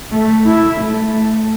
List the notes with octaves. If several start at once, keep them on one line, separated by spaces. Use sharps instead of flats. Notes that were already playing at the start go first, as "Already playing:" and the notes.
A3
E4
A3